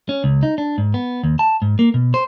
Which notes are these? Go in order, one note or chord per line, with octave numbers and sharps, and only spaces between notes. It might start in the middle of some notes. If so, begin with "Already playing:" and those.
C#4
C#2
D#4
D4
G#2
B3
D#2
A5
G#2
A#3
B2
C5